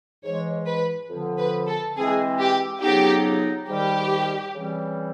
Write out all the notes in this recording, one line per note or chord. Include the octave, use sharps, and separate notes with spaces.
G#2 E3 G#3 C#5
B4
F2 D3 F3
B4
A4
E3 G#3 C4 G#4
G4
F2 C#3 F#3 B3 D#4 G4
G#2 D#3 G3 G4
C#3 E3 G3 C4